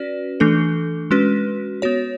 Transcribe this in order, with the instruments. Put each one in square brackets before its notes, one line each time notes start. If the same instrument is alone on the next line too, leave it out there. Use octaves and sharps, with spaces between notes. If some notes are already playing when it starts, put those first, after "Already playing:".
Already playing: [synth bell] C#4 F#4 B4 D5
E3 A3 D4 A4
G#3 C#4 F#4 B4
B3 F#4 C#5